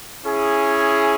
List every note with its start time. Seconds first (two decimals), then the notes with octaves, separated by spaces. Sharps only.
0.24 C#4 E4 G#4